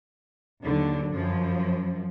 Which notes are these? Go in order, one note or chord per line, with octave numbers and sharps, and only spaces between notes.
D#2 D3 F#3
F#2 F3